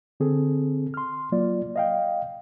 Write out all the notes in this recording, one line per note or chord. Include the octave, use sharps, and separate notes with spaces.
D3 C4 G#4 A4
C6 F6
F#3 A#3 F4 D5
D#5 F5 G5